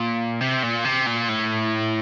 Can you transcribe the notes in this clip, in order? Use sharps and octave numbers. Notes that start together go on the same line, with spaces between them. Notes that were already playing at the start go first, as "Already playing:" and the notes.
Already playing: A#2
C3
A#2
C3
A#2
A2